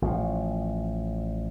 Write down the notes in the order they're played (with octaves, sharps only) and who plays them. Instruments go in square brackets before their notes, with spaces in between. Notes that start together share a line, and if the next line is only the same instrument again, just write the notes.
[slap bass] A1 F3